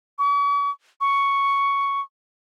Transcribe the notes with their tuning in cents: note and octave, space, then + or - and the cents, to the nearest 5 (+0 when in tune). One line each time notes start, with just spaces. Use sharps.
C#6 +45
C#6 +5